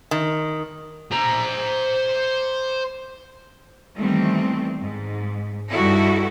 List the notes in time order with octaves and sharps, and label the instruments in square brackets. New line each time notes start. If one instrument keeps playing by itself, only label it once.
[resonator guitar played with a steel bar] D#3
[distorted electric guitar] C5 A#5
[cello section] D#3 E3 G3 A3 B3 C4
G#2
G2 G3 D#4 E4 F#4 A4